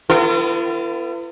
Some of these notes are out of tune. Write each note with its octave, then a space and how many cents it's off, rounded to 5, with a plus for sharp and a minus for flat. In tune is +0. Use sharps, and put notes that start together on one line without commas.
B3 +30 F4 -45 A#4 -40